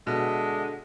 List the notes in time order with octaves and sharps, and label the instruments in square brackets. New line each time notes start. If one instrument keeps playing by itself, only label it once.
[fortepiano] B2 [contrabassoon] D3 [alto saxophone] G#3 [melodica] D4 D#5 E5